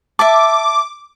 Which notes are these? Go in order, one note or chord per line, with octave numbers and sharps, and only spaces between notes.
E5 A5 D6